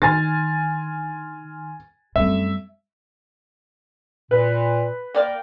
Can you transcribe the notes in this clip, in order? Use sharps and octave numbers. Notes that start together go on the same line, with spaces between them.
D3 D#3 G#5 C6 F6 A6
F#2 G3 A3 C4 E5
A#2 B4
A#3 A#4 D5 F5 G5